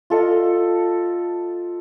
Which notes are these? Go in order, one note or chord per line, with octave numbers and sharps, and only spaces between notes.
F4 A4 D#5 F5